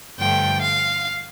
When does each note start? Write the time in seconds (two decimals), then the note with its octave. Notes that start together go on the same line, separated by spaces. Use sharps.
0.18 G2 D3 F3 A3 G5
0.62 F5